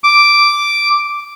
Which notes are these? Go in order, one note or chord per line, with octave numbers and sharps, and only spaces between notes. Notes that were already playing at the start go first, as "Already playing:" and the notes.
D6